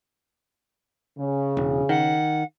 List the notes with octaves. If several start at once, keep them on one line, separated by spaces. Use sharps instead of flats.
C#3
E1
D#3 F#5